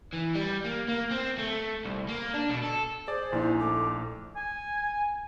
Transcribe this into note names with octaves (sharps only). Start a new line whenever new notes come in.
E3
G3
A#3
A#3
C4
A3
C2
A#3
D4
B2
A4
G#4 C5 D5
A#1 A#3 D#4 E4 G#5 C6
A3 D6
G#5